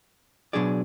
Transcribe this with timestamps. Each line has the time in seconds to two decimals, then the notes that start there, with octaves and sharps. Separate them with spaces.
0.53 B2 F#3 D4 G#4 D5